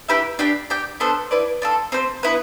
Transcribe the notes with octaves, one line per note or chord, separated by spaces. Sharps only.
E4 G4 B4 E5
D4 G4 D5 G5
G4 D5 G5
B3 D4 A4 C5
E4 B4 D5
D4 F4 A4
C4 G4 C5
B3 E4 B4